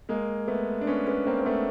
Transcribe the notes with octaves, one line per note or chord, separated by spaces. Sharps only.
G#3 A#3
A3 B3
D4
B3 C#4
B3 C#4
A#3 C4
C4
A3 B3